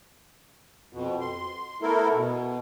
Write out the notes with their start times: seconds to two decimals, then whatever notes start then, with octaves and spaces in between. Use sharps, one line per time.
0.93 F2 B2
1.20 C6
1.82 A3 B3 E4 A4 A#4
2.14 B2